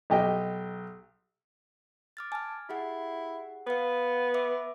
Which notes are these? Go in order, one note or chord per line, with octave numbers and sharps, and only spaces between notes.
B1 G4 D#5
D6 F6 A6
G#5 A5 F6
E4 G4 G#4 F#5
B3 F5 F#5
E5 D6